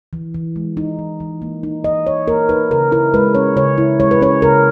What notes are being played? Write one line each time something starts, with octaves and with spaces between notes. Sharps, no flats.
E3
E3
G#3
D#4
E3
E3
A#3
D#4
E3 D#5
E3 C#5
A#3 A#4
D#4 B4
C#3 A#4
E4 A#4
G#3 B4
C#4 C#5
C#3 C#5
E4
G#3 C#5
B4
C#4 C#5
C#3 A#4